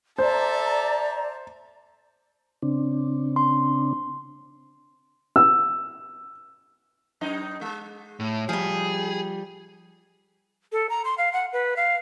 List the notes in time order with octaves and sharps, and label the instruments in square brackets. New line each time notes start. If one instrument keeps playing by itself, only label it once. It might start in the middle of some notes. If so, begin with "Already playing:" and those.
[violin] A4 E5 [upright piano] C5 [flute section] D5 A#5
[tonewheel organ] C#3 C4 D4
[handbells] C6
[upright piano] E6
[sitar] F#2 D#4 D#5
G#3
[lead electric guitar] A2
[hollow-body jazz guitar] F3 G3 [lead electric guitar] G#4
[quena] A4
A#5
C6
F5
F#5
B4
F5